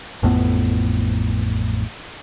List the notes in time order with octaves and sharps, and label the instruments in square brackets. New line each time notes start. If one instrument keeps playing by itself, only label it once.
[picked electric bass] A1 F2 A2 B3